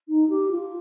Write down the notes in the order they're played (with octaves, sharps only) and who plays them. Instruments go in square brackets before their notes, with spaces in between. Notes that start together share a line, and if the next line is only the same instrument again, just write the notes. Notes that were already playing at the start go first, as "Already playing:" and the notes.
[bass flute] D#4
G4
F4